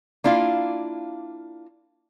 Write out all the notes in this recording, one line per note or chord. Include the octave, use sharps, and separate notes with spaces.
A#3 D4 E4 F4 F5